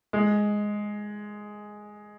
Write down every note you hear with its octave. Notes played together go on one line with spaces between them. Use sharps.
G#3